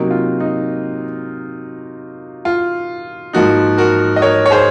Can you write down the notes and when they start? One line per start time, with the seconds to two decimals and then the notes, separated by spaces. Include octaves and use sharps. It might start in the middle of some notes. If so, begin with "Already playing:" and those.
Already playing: C3 F#3 A#3 D#4 F#4
0.10 F4
0.40 D#4
2.45 F4
3.33 G#2 F3 A#3 D#4 F#4
3.78 F#4 A#4
4.16 D#5
4.21 A#4 C#5
4.46 C#5
4.51 G#4 C5